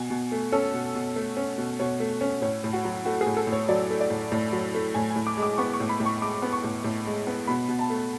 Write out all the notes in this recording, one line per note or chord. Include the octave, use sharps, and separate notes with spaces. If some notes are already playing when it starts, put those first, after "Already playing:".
Already playing: B2 G#5
B2
A3
C#4 A4
B2
B2
A3
C#4
B2
B2 C#5
A3
C#4
A2 C#5
A2
F#4
F#3
A3 F#4
G#4
A2
A4
A2
C#5
F#3 D5
A3
D5
A2
A2
F#3
A3
A2 G#5
G#5
A2
D6
G#3
D6
B3 C#6
C#6
A2
B5
A2
C#6
G#3 D6
B3
C#6
A2
A2
G#3
B3
B2 B5
B2
A5
A3